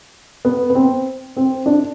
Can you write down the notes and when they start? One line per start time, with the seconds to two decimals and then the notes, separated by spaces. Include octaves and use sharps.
0.45 B3
0.70 B3
0.75 C4
1.37 C4
1.66 D4